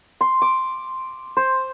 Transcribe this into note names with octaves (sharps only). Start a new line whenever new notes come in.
C6
D6
C5